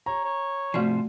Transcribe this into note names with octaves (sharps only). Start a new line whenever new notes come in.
C#5 A#5
C#5
G#2 C3 F3 A3 F#4 D5